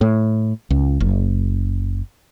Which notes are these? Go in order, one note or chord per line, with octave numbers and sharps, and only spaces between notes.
A2
C#2
F#1